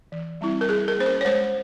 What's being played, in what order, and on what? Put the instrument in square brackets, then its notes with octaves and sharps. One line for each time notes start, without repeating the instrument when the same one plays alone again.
[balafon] E3
G3 C4 E4
A#4
G3 G#4
A#4
A#3 C#4 C5
A#4
C#5
G#3 C5